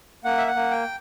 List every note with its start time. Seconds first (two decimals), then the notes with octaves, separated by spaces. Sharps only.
0.24 A#3 F#5
0.38 E5
0.47 F#5
0.55 A#3
0.71 G5